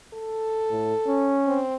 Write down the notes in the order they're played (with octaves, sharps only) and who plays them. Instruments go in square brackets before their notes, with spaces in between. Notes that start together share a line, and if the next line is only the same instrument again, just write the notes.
[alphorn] A4
[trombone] A2
C#4
[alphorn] C4